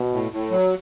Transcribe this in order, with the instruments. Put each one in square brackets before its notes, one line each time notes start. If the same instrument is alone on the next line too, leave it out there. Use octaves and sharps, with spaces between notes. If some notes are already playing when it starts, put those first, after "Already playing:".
Already playing: [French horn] B2
[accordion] A2
A2
F#3